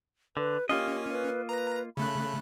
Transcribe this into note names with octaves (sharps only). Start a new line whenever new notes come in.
D3 B4
A#3 C#4 F4 G4 D#5
B4
B4 A#5
C#3 A3 B5 F#6